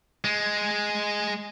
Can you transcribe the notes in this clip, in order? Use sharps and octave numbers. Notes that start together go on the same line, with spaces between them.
G#3